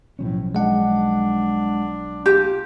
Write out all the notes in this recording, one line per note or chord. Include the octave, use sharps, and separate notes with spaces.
B1 A2 F3 C#4
G#3 D4 F#5
F4 G4